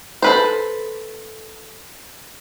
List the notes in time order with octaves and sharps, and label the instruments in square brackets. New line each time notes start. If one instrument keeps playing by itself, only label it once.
[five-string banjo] A4 B4 C5